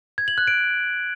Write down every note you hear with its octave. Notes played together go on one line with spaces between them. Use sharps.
G#6
F#7
F#6
D7